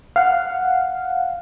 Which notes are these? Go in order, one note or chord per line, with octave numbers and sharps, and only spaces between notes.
F5 F#5